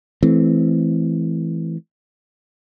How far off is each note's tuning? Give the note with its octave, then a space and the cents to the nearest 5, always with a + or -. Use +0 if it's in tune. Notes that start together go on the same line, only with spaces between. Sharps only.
E3 +0 A3 -30 C4 +0